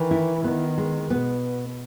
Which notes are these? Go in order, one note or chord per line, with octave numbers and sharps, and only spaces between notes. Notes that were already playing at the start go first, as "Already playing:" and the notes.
Already playing: D#3 E3
E4
D#3 B3
G#3
B2 B3